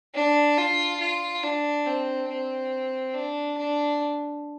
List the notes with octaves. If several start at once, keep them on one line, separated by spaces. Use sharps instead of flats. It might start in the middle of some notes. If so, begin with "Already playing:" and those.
D4
F4
F4
D4
C4
C4
D4
D4